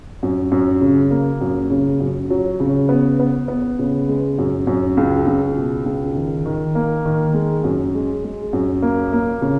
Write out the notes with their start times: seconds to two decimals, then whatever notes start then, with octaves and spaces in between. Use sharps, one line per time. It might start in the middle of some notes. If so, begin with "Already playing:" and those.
0.23 F#2
0.52 F#2
0.81 C#3
1.11 A#3
1.41 F#2
1.70 C#3
2.00 F#2
2.30 F#3
2.60 C#3
2.89 B3
3.20 B3
3.48 B3
3.79 C#3
4.09 G#3
4.38 F#2
4.67 F#2
4.97 C#2
5.27 C#2
5.56 B2
5.86 C#2
6.16 D#3
6.46 D#3
6.75 A#3
7.05 D#3
7.34 G#3
7.64 F#2
7.94 G#3
8.24 G#3
8.53 F#2
8.82 A#3
9.13 A#3
9.42 C#3